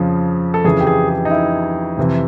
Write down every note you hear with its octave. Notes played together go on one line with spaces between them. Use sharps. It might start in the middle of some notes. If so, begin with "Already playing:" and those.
Already playing: F2 C#3 F3
A4
F2 C#3 E3 G#4
G4
G#4
G#4
D#4
E4
F2 C3 E3